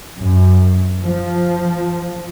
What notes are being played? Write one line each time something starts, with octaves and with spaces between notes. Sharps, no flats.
F#2
F3